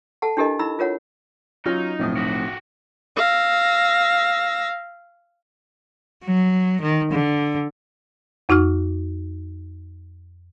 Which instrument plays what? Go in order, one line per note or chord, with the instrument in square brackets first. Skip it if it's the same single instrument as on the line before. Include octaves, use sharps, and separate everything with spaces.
[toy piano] A4 F#5 A5
D4 E4 G4 A4 A#4 D#5
D#4 E4 B5 E6
F4 A#4 C#5 F#5
[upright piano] F#3 C#4 F6 [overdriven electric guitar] D#4 [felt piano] F4
[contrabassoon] F1 [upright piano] B1 A2 D#6
[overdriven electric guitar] F#4 G4
[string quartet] F5 E6 A#6
[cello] F#3
D#3
D3
[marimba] F2 D#4 F#4 C#6 F6